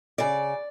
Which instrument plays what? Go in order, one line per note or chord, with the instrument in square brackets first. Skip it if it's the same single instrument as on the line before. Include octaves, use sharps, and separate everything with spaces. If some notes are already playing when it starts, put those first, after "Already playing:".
[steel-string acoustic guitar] C#3 D5